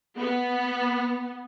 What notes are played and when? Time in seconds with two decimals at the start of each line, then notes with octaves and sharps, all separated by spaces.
0.18 B3